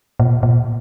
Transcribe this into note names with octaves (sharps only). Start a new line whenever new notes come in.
A#2
A#2